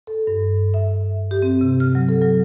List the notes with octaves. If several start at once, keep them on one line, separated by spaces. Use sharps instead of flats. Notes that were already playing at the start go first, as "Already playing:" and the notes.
A4
G2
E5
G4
C4
C3
F6
F#3
A4
F#3